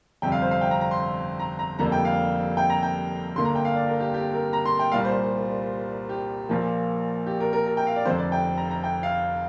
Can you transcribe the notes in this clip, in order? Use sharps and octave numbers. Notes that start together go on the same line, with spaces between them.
G1 F2 C3 G3 G5
F5
C5
F5
G5
A#5
A#5
C6
A#5
A#5
F1 F2 D3 G3 A#3 A#5
G5
F5
G5
A#5
G5
G1 G2 D3 A#3 C6
A#5
G5
F5
D5
A#4
G4
G4
A#4
A#5
C6
G5
C2 A#2 G3 F5
C5
G4
A#1 A#2 F3 A#3
G4
A#4
A#4
A#4
G5
F5
D5
F1 F2 D3 C5
D5
G5
A#5
A#5
G5
F5